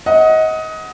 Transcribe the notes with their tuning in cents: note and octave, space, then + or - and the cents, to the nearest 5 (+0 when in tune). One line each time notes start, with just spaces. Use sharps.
D#5 +25 F#5 +0